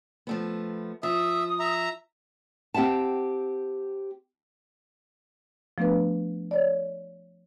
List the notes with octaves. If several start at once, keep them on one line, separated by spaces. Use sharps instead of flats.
F3 A3 B3
F3 E5 D#6
E5 A#5
C4 G4 E5 F#5 A5
F3 A3 B3 D4 B4
C#5 D5